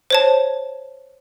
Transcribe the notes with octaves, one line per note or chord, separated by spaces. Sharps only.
C5 C#5 A5